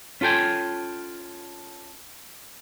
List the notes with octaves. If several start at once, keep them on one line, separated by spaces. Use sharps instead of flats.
C#4 F4 A4 G5 G#5